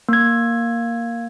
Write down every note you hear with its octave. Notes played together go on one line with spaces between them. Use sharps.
A#3 G#6